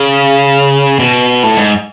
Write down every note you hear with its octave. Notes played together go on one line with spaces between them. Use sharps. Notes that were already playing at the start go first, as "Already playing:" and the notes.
Already playing: C#3
B2
A2
G#2